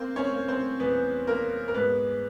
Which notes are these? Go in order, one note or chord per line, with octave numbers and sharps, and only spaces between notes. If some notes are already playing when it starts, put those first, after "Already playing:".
Already playing: A#3 C4 C5
C#4 C#5
A#3
C4 C5
E2 B3 B4
A#3 A#4
A#4
G#2 B3 B4